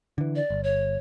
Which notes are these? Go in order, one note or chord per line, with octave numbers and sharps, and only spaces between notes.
D3 E3
D5
G1
C#5